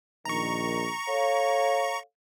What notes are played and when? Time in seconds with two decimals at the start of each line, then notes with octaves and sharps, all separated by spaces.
0.25 A#1 D#3 A#5 C#6
1.08 A4 C#5 F5